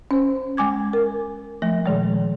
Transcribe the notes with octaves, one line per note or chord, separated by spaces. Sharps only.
C#4 C5
G#3 G#5 D6 G#6
A#4
F3 A3
A#2 D#3 G#3